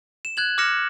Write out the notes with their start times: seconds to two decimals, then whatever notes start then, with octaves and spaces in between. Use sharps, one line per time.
0.25 E7
0.37 F#6 G#6 F#7
0.58 D6 F6 F#6 A#6 C#7 E7